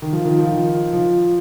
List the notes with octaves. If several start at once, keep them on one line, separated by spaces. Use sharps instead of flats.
D#3
F3
D#3
F3
D#3
F3